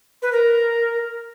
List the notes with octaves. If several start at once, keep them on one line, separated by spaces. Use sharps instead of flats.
B4
A#4